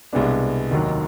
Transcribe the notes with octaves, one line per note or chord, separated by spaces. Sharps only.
C2 B2 G#3 B3 D4
F1 D#2 D#3 F#3